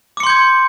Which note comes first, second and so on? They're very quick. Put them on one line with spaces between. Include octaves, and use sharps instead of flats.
D6 C#7 C6 G6 G#6